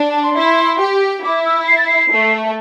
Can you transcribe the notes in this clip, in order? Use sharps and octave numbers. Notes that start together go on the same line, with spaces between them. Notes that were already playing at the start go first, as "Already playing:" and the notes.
Already playing: D4
A5
C6
E4
G4
E4 D6
E6
C7
A6
C7
A3